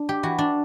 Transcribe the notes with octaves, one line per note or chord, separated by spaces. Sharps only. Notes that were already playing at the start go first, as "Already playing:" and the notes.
Already playing: D4
G4
E3 F#4
D4